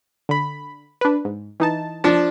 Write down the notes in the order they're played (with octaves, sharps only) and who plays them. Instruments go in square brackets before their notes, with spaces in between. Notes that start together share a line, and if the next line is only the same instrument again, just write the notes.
[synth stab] D3 B5
D4 B4
G#2
E3 D#4 A5
[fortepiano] F3 D4